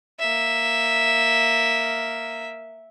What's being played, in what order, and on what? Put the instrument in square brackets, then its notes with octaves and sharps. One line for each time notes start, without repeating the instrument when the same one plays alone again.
[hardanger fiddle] A#3 E5